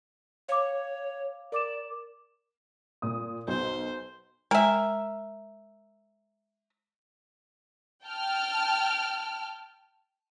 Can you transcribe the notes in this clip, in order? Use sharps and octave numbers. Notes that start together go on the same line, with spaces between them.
C#5 F5 D6
A#4 D5 D6 E7
A#2 D#6
B1 C5
G#3 A#4 E5 G5 G#5
G5 A5 F6